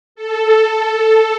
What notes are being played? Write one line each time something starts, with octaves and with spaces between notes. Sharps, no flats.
A4